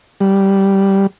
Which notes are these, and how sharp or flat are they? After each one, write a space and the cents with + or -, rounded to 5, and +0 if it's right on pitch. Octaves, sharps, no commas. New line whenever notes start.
G3 -5